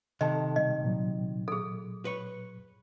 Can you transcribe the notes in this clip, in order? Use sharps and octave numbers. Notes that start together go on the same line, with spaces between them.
C3 D#3 A4 D#5 A5
B2 G3 D#5
A#2 F#3
G#4 A4
B4 C#5